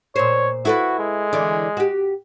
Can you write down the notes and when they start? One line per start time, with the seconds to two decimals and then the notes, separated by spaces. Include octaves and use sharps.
0.16 A#2 C5 C#5
0.65 E4 F#4 A4 B4
0.99 G#3
1.33 D3 E3 D5
1.77 F#4 G4